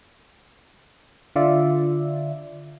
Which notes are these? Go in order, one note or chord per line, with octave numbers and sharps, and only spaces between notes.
D3 F4 D5 E5